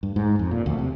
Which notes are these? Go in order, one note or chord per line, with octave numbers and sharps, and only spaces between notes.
G2
G#2
F2
A#2
D2
C3